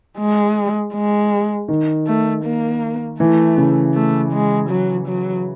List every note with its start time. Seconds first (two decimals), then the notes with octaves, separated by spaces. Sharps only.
0.18 G#3
0.94 G#3
1.68 D#3
2.07 A3
2.45 A#3
3.20 E3 A3
3.58 C#3
3.95 A3
4.33 G#3
4.70 F#3
5.08 F#3